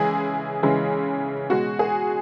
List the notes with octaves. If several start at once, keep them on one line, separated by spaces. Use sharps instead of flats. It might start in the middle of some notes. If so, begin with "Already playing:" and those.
Already playing: C#3 E3 G#3 G#4
C#3 E3 G#3
B2 G#3 F#4
G#4